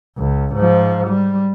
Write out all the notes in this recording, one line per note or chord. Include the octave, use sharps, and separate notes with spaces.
C#2
G#2 F3
G3